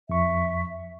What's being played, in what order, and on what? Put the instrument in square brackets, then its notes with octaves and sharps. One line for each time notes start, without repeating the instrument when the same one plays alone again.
[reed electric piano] F2 C#6 [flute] E5